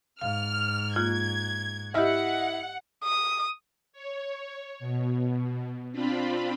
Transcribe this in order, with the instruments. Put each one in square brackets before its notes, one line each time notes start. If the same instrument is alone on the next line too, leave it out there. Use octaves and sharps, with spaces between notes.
[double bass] G#2 [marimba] F5 [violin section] F6
[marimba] A#3 F4 [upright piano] F#6 [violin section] G#6
[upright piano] E4 D#5 E5 [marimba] G4 F6 [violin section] F#5
[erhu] D#6
[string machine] C#5
B2
C4 D4 F4 B5